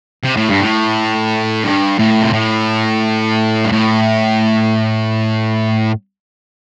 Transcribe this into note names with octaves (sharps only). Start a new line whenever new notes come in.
C3
A2
G2
A2
G2
A2
C3
A2
G2
A2